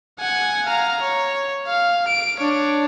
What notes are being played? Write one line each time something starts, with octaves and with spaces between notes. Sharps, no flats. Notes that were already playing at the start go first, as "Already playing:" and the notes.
F#5 G#5
F5 A#5
C#5
F5
D7
D4 C#5